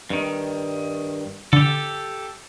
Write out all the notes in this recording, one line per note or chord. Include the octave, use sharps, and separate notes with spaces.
G2 D#3
D3 G4 A4